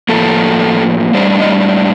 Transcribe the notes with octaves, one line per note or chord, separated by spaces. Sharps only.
A2 F3 A#3 A4
A2 G3 D4 C5
D#5